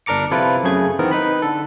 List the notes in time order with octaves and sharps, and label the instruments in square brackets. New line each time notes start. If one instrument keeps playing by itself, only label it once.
[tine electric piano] G1 D4 A#4 A#5 D6 C#7
C3 F3 E4 F4 A4 B4
F#2 C#3 A3 G#4 G#6
D#3 E3 B3 C4 A#4
D#4 B4 B5
D3 A4